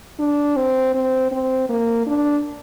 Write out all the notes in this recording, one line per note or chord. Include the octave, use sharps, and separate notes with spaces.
D4
C4
C4
C4
A#3
D4